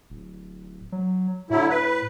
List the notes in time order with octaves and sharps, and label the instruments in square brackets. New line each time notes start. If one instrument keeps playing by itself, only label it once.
[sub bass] D1
F#3
[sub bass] A2 [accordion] D3 F#3 E4
[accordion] B4